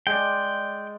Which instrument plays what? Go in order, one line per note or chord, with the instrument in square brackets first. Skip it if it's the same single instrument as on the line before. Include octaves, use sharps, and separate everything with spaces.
[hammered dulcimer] G#3 D5 [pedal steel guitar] G5